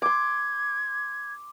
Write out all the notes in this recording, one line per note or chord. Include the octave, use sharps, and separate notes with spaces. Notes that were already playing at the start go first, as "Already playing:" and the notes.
C6 D6 G#6